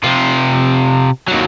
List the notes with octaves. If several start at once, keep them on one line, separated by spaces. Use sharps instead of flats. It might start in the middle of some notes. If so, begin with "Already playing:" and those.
C3 F4
D#2 F#3